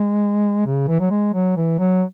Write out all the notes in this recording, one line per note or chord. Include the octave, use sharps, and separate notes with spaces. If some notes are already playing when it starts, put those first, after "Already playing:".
Already playing: G#3
C#3
E3
F#3
G#3
F#3
E3
F#3